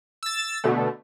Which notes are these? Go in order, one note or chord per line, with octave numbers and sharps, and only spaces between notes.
E6 A6
B2 D3 A3